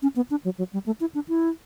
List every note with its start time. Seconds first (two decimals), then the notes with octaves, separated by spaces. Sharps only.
0.02 C#4
0.16 B3
0.30 D4
0.45 F#3
0.58 F#3
0.73 G3
0.86 A3
1.00 E4
1.15 D4
1.28 E4